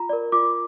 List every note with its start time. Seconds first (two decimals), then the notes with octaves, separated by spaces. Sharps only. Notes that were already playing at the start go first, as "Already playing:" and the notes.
Already playing: F4 A#5
0.09 A#4 D5
0.32 F4 D6